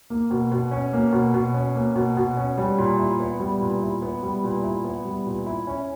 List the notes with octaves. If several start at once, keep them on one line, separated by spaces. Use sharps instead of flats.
A#3
B2
B2
C#4
A#3
B2
B2
C#4
A#3
B2
B2
C#4
G3
A#2
E4
B3
G3
A#2
E4
B3
G3
A#2
E4
B3
G3
A#2
E4
C#4